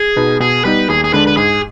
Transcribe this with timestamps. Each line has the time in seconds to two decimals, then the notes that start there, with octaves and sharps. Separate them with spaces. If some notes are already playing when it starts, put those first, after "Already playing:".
Already playing: G#4
0.16 B2 B3 D#4
0.40 B2 G#4
0.65 G3 B3 D#4 B4
0.89 D#2 G#4
1.04 G#4
1.13 D3 G#3 D4 B4
1.27 B4
1.37 G#2 G#4